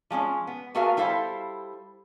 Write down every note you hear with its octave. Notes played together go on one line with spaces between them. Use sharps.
F3 G#3 C4 C#4
B3
A3 B3 F#4 G#4 A#4 F5
G3 E4 A4 C5 F5